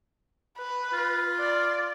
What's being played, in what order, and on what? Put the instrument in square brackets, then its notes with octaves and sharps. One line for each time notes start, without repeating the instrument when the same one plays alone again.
[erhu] B4
[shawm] F4
[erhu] D5